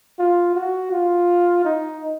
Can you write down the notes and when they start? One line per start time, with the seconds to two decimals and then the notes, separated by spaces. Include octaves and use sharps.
0.19 F4
0.55 F#4
0.92 F4
1.65 D#4